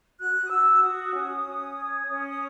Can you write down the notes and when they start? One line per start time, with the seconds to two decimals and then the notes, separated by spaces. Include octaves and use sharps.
0.19 F#4 F#6
0.43 D#6
0.50 F#4 E6
0.82 F#4 D#6
1.13 C#4
1.44 C#4
1.75 C#5
2.07 C#4
2.28 D#6